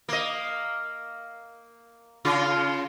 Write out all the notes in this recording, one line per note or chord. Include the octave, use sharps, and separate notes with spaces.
A#3 D#5
C#3 F4